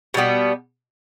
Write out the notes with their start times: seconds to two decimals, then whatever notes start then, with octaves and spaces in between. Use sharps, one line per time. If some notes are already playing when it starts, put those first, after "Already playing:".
0.14 B2 G3 B3